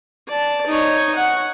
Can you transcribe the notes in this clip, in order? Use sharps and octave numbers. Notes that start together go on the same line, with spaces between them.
D5 A5
D#4 C#5
F#5